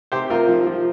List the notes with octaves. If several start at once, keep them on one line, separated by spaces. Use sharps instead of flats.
C3 G4 C5
C3 F4 A#4
F3
F3